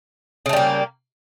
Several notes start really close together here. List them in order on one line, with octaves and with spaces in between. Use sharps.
C#3 A3 G3 A#3